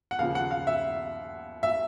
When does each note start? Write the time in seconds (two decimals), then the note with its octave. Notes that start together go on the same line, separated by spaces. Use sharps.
0.11 F#5
0.19 D#2 C#3 F3 F5
0.35 F#5
0.51 F5
0.67 E5
1.63 E5